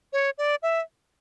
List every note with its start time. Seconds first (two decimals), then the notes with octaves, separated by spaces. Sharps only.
0.13 C#5
0.38 D5
0.62 E5